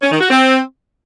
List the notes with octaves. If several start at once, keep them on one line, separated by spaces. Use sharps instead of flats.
C#4
D#3
F#4
C4